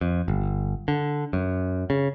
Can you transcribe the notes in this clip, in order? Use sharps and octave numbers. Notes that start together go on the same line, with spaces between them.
F2
G1
D3
F#2
C#3